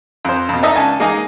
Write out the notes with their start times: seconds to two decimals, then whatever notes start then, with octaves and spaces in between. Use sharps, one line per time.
0.25 F2 C5
0.49 F2 B2
0.63 D4 D#4 A4 A#4 D#5 E5
0.75 C#2 G#5 A5
1.00 G#3 A#3 D#4 D#5 G#5